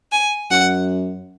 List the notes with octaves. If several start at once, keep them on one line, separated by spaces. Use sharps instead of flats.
G#5
F#2 F#5